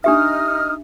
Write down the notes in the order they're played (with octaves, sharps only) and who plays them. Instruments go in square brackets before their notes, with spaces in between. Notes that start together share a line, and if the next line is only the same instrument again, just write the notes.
[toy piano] D4 G4 E5 [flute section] D#4 D#6 F6